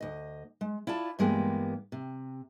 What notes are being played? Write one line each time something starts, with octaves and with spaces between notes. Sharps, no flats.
D2 D#5
G#3
E4 F4 D5 A5
G2 E3 G#3 A#3 B3 G4
C3